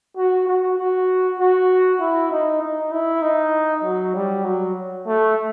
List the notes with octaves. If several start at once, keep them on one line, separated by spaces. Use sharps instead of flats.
F#4
F#4
F#4
F#4
E4
D#4
D#4
E4
D#4
F#3
G3
F#3
A3